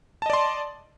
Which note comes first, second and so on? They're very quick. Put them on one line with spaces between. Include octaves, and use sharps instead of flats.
A5 D#5 D5 C6